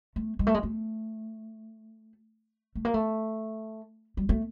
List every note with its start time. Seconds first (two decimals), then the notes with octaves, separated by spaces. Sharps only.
0.16 A3
0.39 G#3
0.47 A3
0.54 G#3
0.63 A3
2.75 A3
2.85 A#3
2.94 A3
4.17 G3
4.29 A3